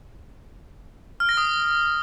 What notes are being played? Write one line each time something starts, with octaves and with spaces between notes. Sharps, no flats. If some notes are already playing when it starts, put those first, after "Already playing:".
F6
A#6
D#6